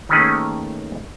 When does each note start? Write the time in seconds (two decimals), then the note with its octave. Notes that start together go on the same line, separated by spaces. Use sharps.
0.09 D#3 A3 A#3 C#4 G#4 B4